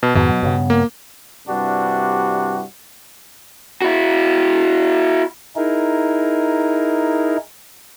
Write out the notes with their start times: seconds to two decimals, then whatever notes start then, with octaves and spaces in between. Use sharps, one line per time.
0.03 B2
0.15 F2 G#2 B2 D#3
0.29 F#3
0.43 G2 C#3 B3
0.70 A#3
1.47 G2 C3 G3 D4 E4 F#4
3.82 E4 F#4
5.56 D#4 E4 G#4 A#4